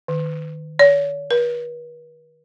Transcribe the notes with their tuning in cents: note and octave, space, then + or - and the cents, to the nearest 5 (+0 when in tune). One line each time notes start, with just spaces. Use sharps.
D#3 -15
C#5 +40
B4 -45